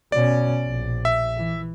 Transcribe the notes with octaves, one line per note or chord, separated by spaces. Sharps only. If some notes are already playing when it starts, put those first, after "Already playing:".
B2 C#4 D5
A#1
E5
E3